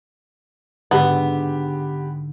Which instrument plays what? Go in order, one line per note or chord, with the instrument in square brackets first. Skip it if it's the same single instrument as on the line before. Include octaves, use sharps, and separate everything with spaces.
[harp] G#2 D3 [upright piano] G#3 G4 [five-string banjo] B3